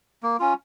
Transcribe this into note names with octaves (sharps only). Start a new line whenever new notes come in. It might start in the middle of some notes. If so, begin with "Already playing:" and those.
A#3
C#4 F4